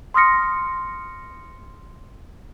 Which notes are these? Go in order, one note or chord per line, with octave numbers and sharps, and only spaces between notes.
C6 D#6 F6 A#6 C#7